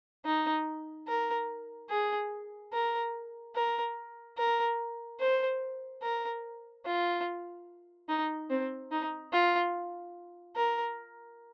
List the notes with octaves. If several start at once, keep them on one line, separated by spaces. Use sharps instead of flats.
D#4
A#4
G#4
A#4
A#4
A#4
C5
A#4
F4
D#4
C4
D#4
F4
A#4